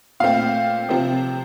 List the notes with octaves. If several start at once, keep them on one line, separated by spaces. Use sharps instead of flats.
A#2 A3 C4 F5
C3 F3 C4